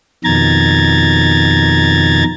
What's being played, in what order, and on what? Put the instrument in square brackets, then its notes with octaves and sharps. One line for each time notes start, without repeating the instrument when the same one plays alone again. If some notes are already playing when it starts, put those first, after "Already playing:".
[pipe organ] F2 B2 D#3 A#5 G#6 A6